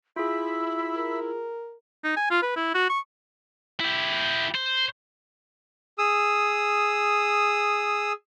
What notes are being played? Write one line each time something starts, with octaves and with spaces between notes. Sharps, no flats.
E4 F4 G#4 E5 B5
A#4
D#4
G#5
F4
B4
E4
F#4
C#6
E4 G4
C5
G#4 D#6 E6